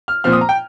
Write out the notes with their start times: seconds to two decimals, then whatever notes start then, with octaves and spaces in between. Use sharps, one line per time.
0.08 F6
0.24 A#2 F3 C4 F6
0.32 D#6
0.41 A#5
0.49 G5